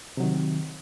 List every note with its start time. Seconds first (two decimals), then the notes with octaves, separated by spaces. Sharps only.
0.17 C3
0.20 F#3
0.23 D#3